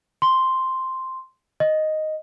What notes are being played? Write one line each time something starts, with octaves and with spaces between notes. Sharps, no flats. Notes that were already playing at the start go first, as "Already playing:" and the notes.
C6
D#5